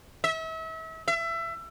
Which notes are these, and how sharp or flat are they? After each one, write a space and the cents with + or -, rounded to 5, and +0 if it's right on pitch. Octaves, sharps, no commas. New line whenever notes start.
E5 -35
E5 +25